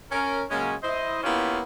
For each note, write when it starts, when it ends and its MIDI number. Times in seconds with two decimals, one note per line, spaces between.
0.11 0.42 61
0.11 0.42 70
0.50 0.74 49
0.50 0.74 54
0.50 0.74 56
0.50 0.74 58
0.50 0.74 61
0.83 1.21 64
0.83 1.21 72
0.83 1.21 75
1.23 1.61 58
1.23 1.61 59
1.23 1.61 61
1.23 1.61 64
1.23 1.61 65
1.23 1.61 67